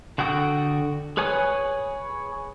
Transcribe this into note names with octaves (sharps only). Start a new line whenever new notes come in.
D3 F#4 A4 G5 D#6
G#4 B4 C#5 G#5 D#6